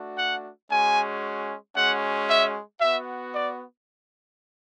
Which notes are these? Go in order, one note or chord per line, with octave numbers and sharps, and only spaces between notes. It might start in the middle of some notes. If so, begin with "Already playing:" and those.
Already playing: A3 D4 F#4
F#5
G#3 C#4 F#4 G#5
G#3 C#4 F#4 F#5
E5
B3 F#4 E5
D5